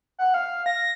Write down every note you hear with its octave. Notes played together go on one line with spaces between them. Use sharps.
F#5
F5
A#6